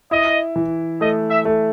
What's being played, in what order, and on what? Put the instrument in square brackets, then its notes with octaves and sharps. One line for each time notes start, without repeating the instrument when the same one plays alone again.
[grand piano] E4 [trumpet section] D#5
[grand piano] E3
[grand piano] A3 [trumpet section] D#5
[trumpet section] E5
[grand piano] A3